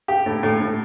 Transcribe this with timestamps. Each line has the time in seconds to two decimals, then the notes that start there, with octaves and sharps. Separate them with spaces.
0.08 G4
0.26 A2
0.43 A2
0.60 A2